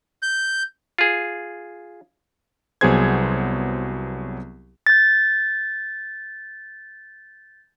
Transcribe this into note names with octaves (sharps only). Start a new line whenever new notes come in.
G6
F4 G#4
C2 F#3 B3 G#4 C5 G#6
G6 A6